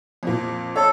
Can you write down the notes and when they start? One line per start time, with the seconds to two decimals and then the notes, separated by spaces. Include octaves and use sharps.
0.23 F2 A#2
0.76 A4 C#5 A5